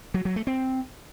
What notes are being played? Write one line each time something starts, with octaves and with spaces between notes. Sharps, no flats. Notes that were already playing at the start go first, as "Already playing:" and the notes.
F#3
F#3
A3
C4